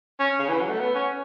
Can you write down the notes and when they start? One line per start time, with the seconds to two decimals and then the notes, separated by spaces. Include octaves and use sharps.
0.19 C#4
0.39 C#3
0.49 E3
0.60 F#3
0.69 A3
0.80 B3
0.95 C#4